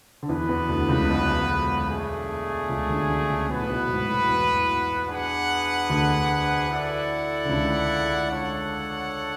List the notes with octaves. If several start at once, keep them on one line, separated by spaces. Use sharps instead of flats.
D3
E2 E3 B3 F#4 B4
E2 E3
D2 D3
C#2 C#3
B1 B2
A3 D4 G#4
C#2 C#3
D2 D3
D2 D3
C#2 C#3
B1 B2 B3 F#4 B4
A2
B1 B2
G#2
A2
E2 E3
D4 G#4 B4 F#5
D2 D3
E4 A4 D5 F#5
D3
C#2 C#3
D4 A4 C#5 F#5